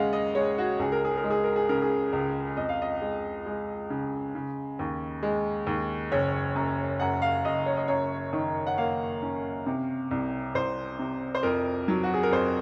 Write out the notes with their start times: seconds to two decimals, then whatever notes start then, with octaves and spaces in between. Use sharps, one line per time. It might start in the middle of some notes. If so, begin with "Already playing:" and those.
Already playing: D#2 C#3 G#3 F5 F#5
0.13 D#5
0.35 G#3 C#5
0.58 F#4
0.79 C#2 G#4
0.92 A#4
1.05 G#4
1.17 A#4
1.24 G#3
1.30 G#4
1.44 A#4
1.56 G#4
1.69 C#3 A#4
1.82 G#4
2.13 C#2
2.57 F2 D#5
2.69 F5
2.82 D#5
3.01 G#3
3.46 G#3
3.90 C#3
4.35 C#3
4.79 D#2
5.23 G#3
5.67 D#2
6.12 F#1 C#5
6.55 F#2
7.00 F#2 F#5
7.22 F5
7.45 F#1 D#5
7.66 C#5
7.77 D#5
7.88 F#2 C#5
8.33 D#3
8.67 F#5
8.78 A#3 F5
9.22 C#4
9.66 C3
10.11 C2
10.54 C2 C5
10.99 C3
11.35 C5
11.43 F2 A#4
11.88 F#3
12.03 F#4
12.14 G#4
12.23 A#4
12.31 F2 C5